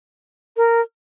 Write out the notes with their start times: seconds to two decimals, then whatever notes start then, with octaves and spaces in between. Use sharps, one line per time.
0.57 A#4